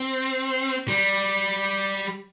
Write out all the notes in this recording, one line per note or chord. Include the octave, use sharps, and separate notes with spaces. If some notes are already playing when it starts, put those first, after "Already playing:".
Already playing: C4
G3